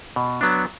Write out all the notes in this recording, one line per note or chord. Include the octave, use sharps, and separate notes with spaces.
B2
F#3 B3 D4